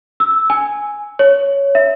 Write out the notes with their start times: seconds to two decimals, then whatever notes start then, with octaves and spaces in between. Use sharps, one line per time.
0.20 E6
0.50 G#5
1.19 C#5
1.75 E5